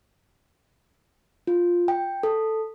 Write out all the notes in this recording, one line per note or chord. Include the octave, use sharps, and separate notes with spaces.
F4
G5
A4